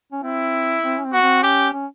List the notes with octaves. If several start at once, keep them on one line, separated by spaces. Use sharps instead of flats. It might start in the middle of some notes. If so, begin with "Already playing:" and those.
C#4
C4 E4
C4
C#4
C4
B3 F#4
C4
C#4 G4
C#4